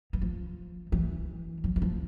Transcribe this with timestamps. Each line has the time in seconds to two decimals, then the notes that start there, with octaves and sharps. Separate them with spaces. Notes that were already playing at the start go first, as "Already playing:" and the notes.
0.13 E3
0.21 F3
0.92 E3
1.64 F3
1.76 E3
1.82 F3